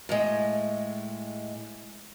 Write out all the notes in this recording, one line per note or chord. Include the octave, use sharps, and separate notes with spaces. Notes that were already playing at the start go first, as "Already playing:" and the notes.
A2 G#3